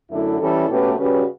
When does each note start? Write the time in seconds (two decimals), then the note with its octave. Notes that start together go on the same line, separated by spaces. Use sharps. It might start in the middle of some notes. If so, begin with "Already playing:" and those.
0.11 F#2 D3 A3 E4
0.40 E3 G3 C#4 E4 A4
0.67 B2 A3 C#4 G4 B4
0.96 C#3 G3 C#4 F#4 B4